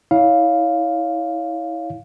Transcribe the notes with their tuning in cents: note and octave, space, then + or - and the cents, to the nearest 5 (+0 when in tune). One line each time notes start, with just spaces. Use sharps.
E4 -30 C#5 +15 F5 +0